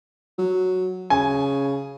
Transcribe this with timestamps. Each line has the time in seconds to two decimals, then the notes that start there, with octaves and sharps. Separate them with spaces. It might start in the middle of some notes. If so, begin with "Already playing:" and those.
0.38 F#3
1.10 C#3 G#5